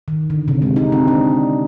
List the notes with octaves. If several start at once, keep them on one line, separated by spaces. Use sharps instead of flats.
D#3
D3
C3
G#3
D#4
C4
D4